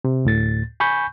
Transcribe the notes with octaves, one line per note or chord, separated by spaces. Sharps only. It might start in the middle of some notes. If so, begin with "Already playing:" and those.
C3
D2 A2 A6
G#5 B5 C#6 G6